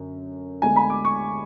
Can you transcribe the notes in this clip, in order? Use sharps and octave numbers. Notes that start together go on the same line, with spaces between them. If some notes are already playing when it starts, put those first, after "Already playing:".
Already playing: F#2 D3
D2 D3 G#3 B3 G#5
B5
D6
C#6